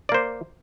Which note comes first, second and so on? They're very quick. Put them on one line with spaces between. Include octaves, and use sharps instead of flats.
D5 A#3 C5